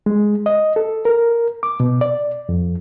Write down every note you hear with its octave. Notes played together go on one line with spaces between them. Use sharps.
G#3
D#5
A4
A#4
D6
B2
D5
F2